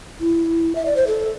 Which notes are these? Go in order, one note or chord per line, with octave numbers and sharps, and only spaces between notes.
E4
E5
D5
C5
A4